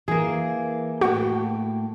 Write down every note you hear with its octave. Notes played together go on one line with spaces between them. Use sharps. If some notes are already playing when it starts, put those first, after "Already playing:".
E3 A#3 G#4
A2 A3 F#4 G5